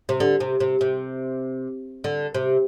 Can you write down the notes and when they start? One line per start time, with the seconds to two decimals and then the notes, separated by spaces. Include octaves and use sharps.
0.09 C3
0.20 D3
0.40 C3
0.60 C3
0.81 C3
2.04 D3
2.34 C3